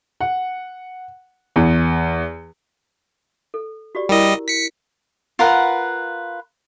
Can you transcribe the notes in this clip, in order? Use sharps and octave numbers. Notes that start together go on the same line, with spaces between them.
F#5
E2
A4
F#4 G4 D5
G3 E4 A#4 D#5
B6 C#7
F4 A#4 B4 F#5